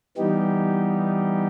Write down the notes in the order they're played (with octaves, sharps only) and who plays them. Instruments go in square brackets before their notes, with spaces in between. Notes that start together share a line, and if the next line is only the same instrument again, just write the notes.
[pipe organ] E3 G3 B3 D#4 G4